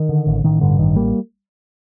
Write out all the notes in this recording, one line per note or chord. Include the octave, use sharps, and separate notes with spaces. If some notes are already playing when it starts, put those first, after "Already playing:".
Already playing: D#3
D3
A1
A1 D#3
G2 D3
A1 D#3
G3 A#3